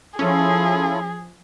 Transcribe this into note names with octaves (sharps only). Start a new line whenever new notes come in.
F3 C#4 E4 F4 G#4 A4